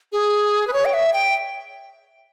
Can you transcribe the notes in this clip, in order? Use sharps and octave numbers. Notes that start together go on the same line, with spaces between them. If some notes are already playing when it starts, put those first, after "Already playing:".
G#4
B4
C#5
G5
E5
G5